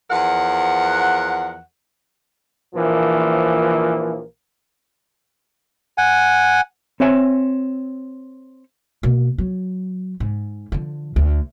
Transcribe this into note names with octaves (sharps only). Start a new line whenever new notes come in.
E2 F3 A#4 F#5
A#1 E3 F3 A#3
F#5 G#5
C4 C#5 E5 G#5
B2 A#3
F#3
G#2
D3 F3
D2